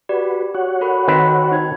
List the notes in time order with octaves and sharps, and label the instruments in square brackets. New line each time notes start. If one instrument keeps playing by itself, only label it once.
[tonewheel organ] F#4 B4 [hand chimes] G4 D5
[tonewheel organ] F#4 C#5 F#5
[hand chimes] A4 A#4 B5
[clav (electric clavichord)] D#3 C4 B4
[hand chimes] D#4 C5 G#6